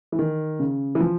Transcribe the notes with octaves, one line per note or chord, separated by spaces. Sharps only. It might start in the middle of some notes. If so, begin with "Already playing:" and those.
E3
D#3
C#3
E3
F3